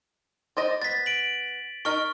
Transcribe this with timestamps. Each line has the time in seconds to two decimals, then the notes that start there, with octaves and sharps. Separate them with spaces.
0.57 C5 D5 D#5
0.82 B3 A6 B6
1.06 D7 F#7
1.85 D#4 A#4 C#6 F6